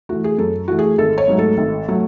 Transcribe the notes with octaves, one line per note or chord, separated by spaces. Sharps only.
E3 A3 F#4
G#4
F#2 A4
E3 A3 F#4
G#4
G#1 A4
C#5
G#2 F#3 A3
A4
G#1
F#3 A3